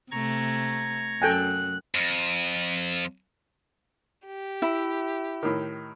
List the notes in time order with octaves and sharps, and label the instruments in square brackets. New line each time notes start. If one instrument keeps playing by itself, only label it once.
[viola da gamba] C3 A3 [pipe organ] A#5 C#6 G#6
[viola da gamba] F#2 [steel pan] A4 G5 G#5 [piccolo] F#6
[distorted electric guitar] F2
[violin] G4
[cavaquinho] E4
[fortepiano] A2 D#3